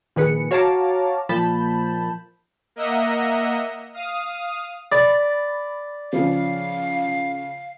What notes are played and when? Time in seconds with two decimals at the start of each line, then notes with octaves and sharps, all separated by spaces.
0.16 A#1 D#3 G#4 B4 C#7
0.51 F#4 C#5 F5 A5 A#5 D6
1.29 A#2 F3 A5 B5 G6
2.76 A#3 D#5 E5 F#5 A#5
3.94 F5 D#6
4.92 D5 B5 A6
6.13 C#3 F3 F5